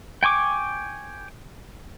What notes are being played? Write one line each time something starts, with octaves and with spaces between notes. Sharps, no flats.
G5 G#5 C#6 D6